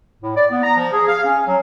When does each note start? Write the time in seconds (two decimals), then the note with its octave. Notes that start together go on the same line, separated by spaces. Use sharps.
0.22 A2
0.36 D5
0.50 B3
0.63 A#5
0.76 F3
0.93 G#4
1.07 F5
1.24 C#4
1.47 F#3